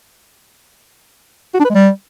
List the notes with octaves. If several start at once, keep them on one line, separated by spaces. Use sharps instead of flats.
F#4
D4
B4
G#3
G3